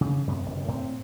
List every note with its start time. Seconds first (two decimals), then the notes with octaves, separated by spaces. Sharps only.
0.01 C#3
0.27 F#2 C3 B3
0.46 F#1 G2 B2
0.68 A2 C4